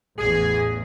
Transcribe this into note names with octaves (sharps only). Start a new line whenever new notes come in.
A1 E2 G#4